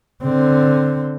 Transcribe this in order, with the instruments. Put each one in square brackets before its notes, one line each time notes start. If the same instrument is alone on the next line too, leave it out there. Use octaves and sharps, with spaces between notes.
[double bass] D3 C4